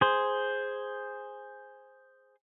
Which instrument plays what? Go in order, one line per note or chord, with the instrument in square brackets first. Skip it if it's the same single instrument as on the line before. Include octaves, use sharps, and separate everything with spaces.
[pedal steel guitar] G#4 C5